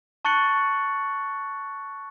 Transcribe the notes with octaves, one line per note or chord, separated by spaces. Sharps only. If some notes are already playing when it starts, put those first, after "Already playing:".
A5 C#6 F#6 A6 C#7 F#7